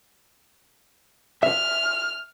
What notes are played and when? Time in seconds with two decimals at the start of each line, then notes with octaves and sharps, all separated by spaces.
1.43 E5 F6